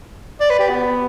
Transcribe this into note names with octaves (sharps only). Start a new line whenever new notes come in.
D5
B4
G4
B3